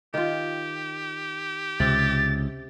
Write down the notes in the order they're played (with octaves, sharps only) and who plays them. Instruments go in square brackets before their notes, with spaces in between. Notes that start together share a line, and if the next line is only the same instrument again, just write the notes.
[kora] D#3 F4 [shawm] G4
[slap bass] C#2 [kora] C3 [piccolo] A6